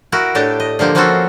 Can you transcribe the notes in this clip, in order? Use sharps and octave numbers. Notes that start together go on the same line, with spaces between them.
E4 F#4 A#4
A2 D4 G4 A5
D#5
D3 F3 A#3 G4
F3 A#3 C4 C#4 F#4 A4